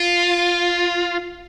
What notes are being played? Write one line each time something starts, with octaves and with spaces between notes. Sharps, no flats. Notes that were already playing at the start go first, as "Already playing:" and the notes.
Already playing: F4